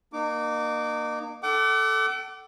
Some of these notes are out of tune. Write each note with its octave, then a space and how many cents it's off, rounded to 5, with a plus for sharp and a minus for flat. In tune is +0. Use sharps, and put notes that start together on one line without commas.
A#3 +15 D#4 -35 D6 -15
A4 +0 F#5 +45 D6 -5